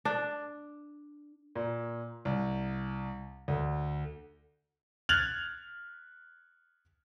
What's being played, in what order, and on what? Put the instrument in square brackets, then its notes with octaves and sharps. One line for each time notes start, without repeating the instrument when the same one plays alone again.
[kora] D4
[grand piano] A#2
C2
D2
F6 F#6 G#6 A6 F7 F#7